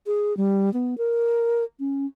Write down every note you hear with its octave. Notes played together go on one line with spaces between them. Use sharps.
G#4
G3
B3
A#4
C#4